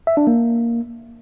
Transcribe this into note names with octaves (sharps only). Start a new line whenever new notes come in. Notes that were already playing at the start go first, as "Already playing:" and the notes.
E5
D4
A#3